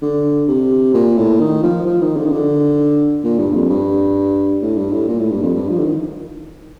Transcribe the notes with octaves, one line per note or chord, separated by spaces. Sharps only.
D3
C3
A#2
A2
D#3
F3
F3
D#3
D3
D#3
D3
A#2
G2
F2
G2
A2
G2
A2
A#2
A2
G2
F2
G2
F3
D3
D#3